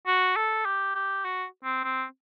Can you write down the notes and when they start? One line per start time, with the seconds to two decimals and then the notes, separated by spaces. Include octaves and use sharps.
0.07 F#4
0.36 A4
0.65 G4
0.95 G4
1.25 F#4
1.64 C4
1.84 C4